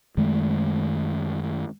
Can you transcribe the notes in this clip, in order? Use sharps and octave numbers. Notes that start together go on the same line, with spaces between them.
F#2 D#3 G#3 A3